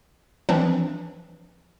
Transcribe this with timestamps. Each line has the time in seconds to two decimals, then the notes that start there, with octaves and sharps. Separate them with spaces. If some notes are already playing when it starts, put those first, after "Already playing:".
0.49 E3 F3 C4 D4